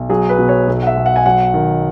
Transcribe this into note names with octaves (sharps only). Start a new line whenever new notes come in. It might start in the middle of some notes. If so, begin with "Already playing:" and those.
Already playing: B1
F#3 G#4
B4
B2
C#5
B1
F#5
E5
B1
F#5
G#5
F#3 F#5
D#3